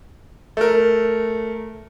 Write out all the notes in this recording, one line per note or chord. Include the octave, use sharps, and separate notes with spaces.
A3 A#4